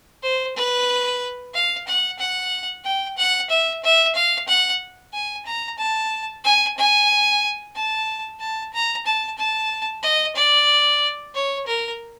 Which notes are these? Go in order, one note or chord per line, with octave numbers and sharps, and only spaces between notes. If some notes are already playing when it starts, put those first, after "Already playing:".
C5
B4
F5
F#5
F#5
G5
F#5
E5
E5
F5
F#5
G#5
A#5
A5
G#5
G#5
A5
A5
A#5
A5
A5
D#5
D5
C#5
A#4